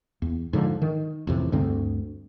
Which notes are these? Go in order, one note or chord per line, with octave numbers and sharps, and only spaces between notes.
E2
G#2 D3 F3
D#3
A1 F2 C3
D2 G2 D3 C4